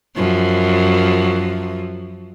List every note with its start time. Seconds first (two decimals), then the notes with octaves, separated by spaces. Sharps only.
0.16 F#2 F3